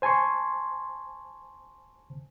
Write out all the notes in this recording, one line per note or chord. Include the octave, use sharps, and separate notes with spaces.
C5 G#5 A5 C6 C#6